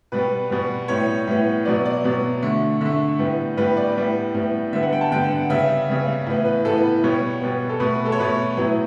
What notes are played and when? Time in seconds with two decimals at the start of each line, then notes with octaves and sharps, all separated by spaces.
0.12 B2 G3 B3 B4
0.50 B2 G3 B3
0.88 A2 G3 B3 C#5
1.28 A2 G3 B3
1.65 B2 F#3 B3 D5
1.85 D5
2.04 B2 F#3 B3
2.42 D3 A3
2.81 D3 A3 E5
3.19 A2 G3 B3
3.57 A2 G3 B3 B4
3.77 D5
3.96 A2 G3 B3
4.35 A2 G3 B3
4.72 D3 G3 B3 E5
4.83 F#5
4.93 G5
5.01 A5
5.12 D3 G3 B3 G5
5.31 F#5
5.49 C#3 G3 B3 E5
5.88 C#3 G3 B3
6.27 A2 E3 B3
6.45 B4
6.65 A2 E3 B3 A4
6.83 B4
7.04 B2 G3 B3 C#5
7.41 B2 G3 B3
7.69 A4
7.80 B2 A3 B4
7.93 B4
8.05 A4
8.12 C#5
8.18 B2 A3 B4
8.57 A2 F#3 B3